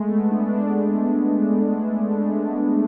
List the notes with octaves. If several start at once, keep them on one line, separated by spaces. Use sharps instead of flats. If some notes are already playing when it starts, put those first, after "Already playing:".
Already playing: G#3 A3
B3
D4